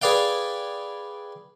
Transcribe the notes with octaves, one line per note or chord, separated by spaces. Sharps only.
G#4 B4 D5 F5 G5